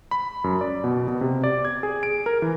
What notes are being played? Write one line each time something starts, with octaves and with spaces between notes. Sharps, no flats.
B5
F#2
D5
B2
B2
C3
D5
G#6
G#4
D7
A#4
E3